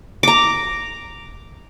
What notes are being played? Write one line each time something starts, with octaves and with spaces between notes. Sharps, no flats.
A#5 D6